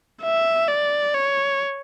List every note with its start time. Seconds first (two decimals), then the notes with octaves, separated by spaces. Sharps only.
0.23 E5
0.68 D5
1.14 C#5